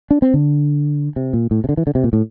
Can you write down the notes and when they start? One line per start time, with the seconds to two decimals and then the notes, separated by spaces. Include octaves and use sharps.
0.11 D4
0.22 C4
0.34 D3
1.16 C3
1.33 A#2
1.51 A2
1.64 C3
1.69 D3
1.77 E3
1.87 D3
1.95 C3
2.04 A#2
2.13 A2